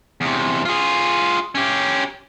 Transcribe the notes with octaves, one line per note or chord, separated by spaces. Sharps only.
E2 C3
F4 G#4
C#4 G4